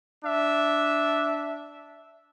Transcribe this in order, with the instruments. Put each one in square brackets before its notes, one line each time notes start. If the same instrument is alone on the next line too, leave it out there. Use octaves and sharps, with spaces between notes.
[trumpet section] D4 E5